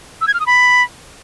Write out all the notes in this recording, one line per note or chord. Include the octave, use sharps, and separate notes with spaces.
E6
G#6
F6
D#6
B5